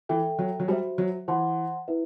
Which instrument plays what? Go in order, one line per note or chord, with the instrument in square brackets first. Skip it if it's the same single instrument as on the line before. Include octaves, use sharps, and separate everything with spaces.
[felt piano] E3 [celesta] A4 E5 G5
[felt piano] F#3
F#3
[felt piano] G3 [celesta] F#4 C5 E5
[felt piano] F#3
[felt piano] E3 [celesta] C5 F#5 A5 C6
[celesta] E4 B4 E5